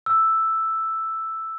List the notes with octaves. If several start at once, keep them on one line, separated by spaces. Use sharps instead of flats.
E6